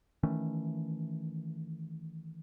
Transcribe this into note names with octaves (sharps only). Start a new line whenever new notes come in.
D#3 E3 A3 C#4